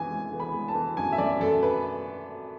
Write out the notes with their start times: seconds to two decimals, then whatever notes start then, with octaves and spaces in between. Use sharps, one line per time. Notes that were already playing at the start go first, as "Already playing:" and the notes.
Already playing: F#2 E3 G#3 G#5
0.10 G#3
0.32 E3
0.40 B5
0.54 G#3
0.68 A5
0.75 E3
0.97 F#2 G#5
1.12 E5
1.18 F#2 D5
1.40 F#2 A4
1.63 B4